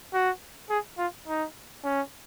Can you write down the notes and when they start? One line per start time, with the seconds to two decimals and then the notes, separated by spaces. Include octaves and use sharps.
0.13 F#4
0.70 G#4
0.98 F4
1.28 D#4
1.84 C#4